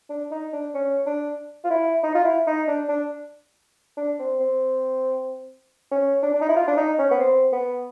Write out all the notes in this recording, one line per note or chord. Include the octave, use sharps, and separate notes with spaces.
D4
D#4
D4
C#4
D4
F4
E4
D#4
F4
E4
D#4
D4
D4
D4
C4
C4
C#4
D4
D4
D#4
E4
F4
D4
D#4
C#4
B3
C4
B3